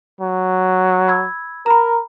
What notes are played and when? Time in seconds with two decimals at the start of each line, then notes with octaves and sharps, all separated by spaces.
0.21 F#3
1.08 B5 E6 G#6
1.66 A#4 A#5 B5